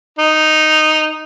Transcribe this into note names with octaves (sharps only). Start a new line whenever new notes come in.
D#4